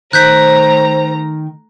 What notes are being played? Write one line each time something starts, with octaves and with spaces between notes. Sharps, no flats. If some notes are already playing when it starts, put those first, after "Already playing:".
D#3 A3 C5 A#5 F#6 G6 B6